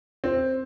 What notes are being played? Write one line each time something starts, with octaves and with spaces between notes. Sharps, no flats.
C4